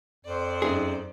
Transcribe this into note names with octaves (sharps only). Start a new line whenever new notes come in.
F2 C5 D5
F#2 D#4 G#4